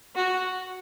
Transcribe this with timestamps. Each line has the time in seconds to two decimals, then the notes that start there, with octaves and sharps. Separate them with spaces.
0.15 F#4